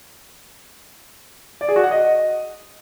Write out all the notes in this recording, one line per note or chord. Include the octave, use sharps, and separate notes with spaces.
D5
G#4
F#4
F#5
D#5